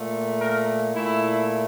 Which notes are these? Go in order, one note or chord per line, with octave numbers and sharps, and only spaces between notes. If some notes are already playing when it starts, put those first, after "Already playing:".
Already playing: A#2 A3
A#4
A#2 A3 E4